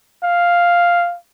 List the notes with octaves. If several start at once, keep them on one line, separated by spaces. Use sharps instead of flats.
F5